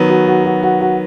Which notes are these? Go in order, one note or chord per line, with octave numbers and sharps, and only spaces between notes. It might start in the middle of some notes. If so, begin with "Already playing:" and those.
Already playing: D#3 F#3 B3
F#4
F#4
F#4
F#4
F#4